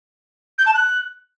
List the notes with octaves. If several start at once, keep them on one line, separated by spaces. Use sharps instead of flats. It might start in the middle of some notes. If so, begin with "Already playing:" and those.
G6
A5
F#6